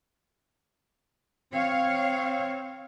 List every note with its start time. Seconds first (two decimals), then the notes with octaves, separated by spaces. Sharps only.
1.53 C4 C#5 F5